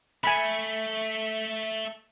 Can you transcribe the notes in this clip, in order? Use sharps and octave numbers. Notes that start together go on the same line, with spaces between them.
A3 E5 G#5 B5